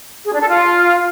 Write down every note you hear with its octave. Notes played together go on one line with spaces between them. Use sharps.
G#4
D4
A4
F4